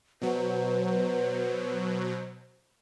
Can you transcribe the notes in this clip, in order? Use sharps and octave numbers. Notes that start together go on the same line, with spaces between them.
B2 F#3 B4 C5